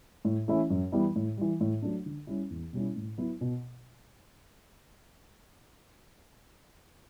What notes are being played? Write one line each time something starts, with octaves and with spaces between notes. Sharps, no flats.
A2
E3 A3 C#4 E4
F#2
E3 G3 B3 E4
A2
E3 G3
A2
F#3 A3 D4
D3
G3 C#4 E4
E2
B2 G3 C#4 E4
A2
F#3 B3 E4
B2